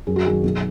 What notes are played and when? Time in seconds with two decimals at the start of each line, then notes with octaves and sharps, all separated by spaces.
0.07 F#2 G#4
0.16 F#4
0.25 D#3 F#3 G#4
0.44 B1